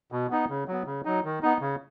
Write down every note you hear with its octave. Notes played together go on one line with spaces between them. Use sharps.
B2
B3 D#4
C#3
F#3 B3
C#3
F#3 D#4
D#3
B3 D#4
C#3